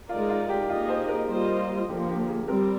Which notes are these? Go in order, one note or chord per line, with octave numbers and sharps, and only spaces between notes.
G#3 D#4 F4 A#4 D5
F4
G4
A#3 D#4 F4 G#4 D#5
C5
A#4
G3 A#3 F4 C5 D#5
D3 F3 A#3 G4
G4
G#4
G3 C4 A#4